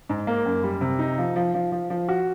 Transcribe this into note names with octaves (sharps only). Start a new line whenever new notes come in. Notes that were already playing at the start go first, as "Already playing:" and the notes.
G#2
A#3
F#2
G3
C3
D#4
F3
F3
F3
F3
F3
F#4